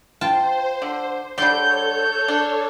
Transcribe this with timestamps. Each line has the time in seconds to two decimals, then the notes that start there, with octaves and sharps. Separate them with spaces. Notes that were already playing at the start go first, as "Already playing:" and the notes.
0.21 F4 C5 G5 A5
0.82 D3
1.38 D3 G3 A4 C#5 D5 C6 G6
2.28 D4